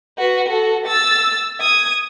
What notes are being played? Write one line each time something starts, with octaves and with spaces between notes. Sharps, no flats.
F#4 B4
F#4 A4
E6 A6
D#6 G#6